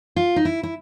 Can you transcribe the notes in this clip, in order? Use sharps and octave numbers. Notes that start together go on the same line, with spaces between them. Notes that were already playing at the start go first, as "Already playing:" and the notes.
F4
D#4
E4
E4